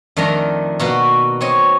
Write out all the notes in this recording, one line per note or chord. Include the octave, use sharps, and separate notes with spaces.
F2 D#3 A3 D4 A#4 A#5
B2 A#3 F#4 B4
C4 C#5 D#5